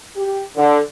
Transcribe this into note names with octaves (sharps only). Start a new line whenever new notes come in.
G4
D3